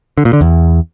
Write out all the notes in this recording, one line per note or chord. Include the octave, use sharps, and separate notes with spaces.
D3
A#2
D3
E2